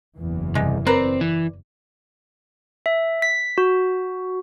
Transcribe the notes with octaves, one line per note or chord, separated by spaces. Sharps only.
F#1 E2 E3
C2 G#3
C4 A#4 B4 D5
E3
E5
B6
F#4